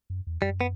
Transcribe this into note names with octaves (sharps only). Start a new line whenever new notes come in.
F#2
E2
F#2 G3
B3